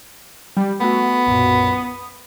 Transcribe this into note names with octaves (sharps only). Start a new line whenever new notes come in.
G3
A3 B3 F#4
B1 F#2 A#2
D#6